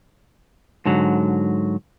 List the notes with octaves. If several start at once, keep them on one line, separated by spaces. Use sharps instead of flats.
G#2 D3 F#3